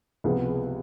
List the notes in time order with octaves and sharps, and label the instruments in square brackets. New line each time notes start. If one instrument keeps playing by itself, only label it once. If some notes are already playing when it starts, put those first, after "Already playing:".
[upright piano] C#2 C3 F3 G#3 B3